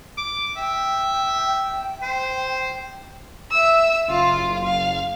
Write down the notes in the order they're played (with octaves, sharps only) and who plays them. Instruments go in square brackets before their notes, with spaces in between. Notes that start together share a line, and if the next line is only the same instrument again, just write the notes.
[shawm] D6
[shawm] E5 [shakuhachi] G5
[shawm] C5
[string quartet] E5 E6
[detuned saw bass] F#1 [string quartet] F4 F5
[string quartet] F5